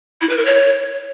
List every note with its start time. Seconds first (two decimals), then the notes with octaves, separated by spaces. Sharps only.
0.21 E4
0.29 B4
0.37 A#4
0.45 C#5